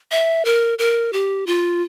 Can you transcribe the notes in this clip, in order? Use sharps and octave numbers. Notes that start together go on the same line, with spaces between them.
E5
A#4
A#4
G4
F4